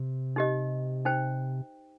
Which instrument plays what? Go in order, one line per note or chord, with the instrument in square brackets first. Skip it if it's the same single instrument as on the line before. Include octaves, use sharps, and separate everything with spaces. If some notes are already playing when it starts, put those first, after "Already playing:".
Already playing: [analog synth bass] C3
[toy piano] D#4 G4 D#5
D#4 C5 G5